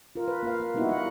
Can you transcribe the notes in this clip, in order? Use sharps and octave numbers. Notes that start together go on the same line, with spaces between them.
F4 A#4
B4
A#3 F4 F5
A#3
G3 A#3 B3 D#4 E4 F#4
G3 F#5